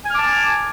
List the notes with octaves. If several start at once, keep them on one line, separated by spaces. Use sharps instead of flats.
G#5 A5 D6 F6